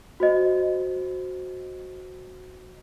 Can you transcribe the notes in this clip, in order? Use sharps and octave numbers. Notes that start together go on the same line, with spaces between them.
F#4 C5 D#5